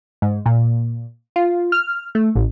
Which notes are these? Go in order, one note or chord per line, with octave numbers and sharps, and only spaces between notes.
G#2
A#2
F4
F6
A3
A1